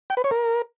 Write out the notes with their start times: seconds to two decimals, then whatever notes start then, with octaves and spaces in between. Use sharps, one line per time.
0.10 G5
0.17 B4
0.24 C#5
0.31 A#4